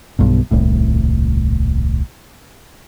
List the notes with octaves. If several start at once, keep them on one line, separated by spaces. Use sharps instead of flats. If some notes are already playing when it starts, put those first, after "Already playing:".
B1 G2 B2
D#1 C2 A2